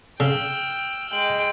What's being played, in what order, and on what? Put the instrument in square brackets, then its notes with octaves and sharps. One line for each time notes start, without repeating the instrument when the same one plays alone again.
[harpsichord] C#3 [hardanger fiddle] G5 [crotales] E6 F6 E7
[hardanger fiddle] G#3 G5 [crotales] F6 F#7